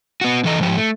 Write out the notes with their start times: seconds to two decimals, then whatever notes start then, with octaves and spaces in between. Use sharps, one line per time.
0.21 B3 F#4
0.44 F2 E3 A4 D#5 A#5
0.59 G#2 F3 G4
0.77 A3